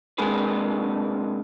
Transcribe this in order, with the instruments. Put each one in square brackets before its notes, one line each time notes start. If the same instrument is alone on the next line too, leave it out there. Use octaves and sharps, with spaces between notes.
[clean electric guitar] C3 G#3 A#3 D4 G#4 B4